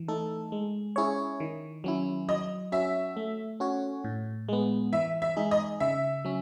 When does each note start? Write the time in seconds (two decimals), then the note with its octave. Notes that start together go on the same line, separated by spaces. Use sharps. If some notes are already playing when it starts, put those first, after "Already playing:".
Already playing: E3
0.08 A3 D#4 A4
0.52 G#3
0.96 C#4 E4 G#4 C#5
1.40 D#3
1.84 F#3 C#4 E4
2.28 F#3 D#5
2.72 C#4 F#4 E5
3.17 A3
3.60 C#4 F#4 C#5
4.04 A2
4.49 G#3 B3
4.92 E3 E5
5.22 E5
5.37 G#3 D#4 G#4
5.51 D#5
5.80 C#3 E5
6.25 F#3 C#4